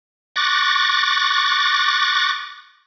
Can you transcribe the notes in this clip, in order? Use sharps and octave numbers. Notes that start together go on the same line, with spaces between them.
C#6 D6 F#6 A6 A#6